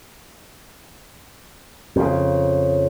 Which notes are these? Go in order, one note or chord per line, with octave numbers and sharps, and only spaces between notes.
F2 C#3